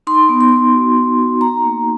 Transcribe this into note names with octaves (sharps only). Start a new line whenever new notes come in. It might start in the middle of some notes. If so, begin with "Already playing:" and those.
D#4 C6
B3
C6
B3
F#4
D#4
F#4
D#4 A#5
A#3